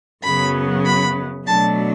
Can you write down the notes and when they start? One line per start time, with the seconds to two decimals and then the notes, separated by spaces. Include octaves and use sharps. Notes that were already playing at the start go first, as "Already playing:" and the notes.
0.24 F#2 C#3 F#3 B3 B5
0.86 B5
1.47 B2 F#3 A3 D4 A5